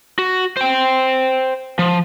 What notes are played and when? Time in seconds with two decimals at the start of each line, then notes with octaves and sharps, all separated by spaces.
0.19 F#4
0.57 C5 G5
1.79 F3